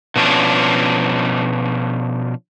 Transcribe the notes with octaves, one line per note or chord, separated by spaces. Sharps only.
B2 F3 C#4 D4